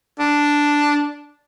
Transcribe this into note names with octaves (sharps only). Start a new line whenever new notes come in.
D4